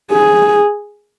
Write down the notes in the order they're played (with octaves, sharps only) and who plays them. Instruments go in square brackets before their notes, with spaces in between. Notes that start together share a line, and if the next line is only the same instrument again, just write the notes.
[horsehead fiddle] G#4